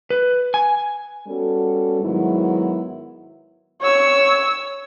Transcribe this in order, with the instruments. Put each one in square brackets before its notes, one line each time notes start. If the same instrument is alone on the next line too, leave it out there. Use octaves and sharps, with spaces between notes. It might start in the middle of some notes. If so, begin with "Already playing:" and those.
[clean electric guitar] B4
G#5
[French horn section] G3 B3 C#4 F#4 A4
G#2 D#3 F#3 B3 E4
[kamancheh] C#5 E6